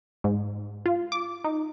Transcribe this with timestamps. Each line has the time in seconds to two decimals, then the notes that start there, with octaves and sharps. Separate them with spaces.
0.24 G#2
0.86 F4
1.12 D6
1.44 D#4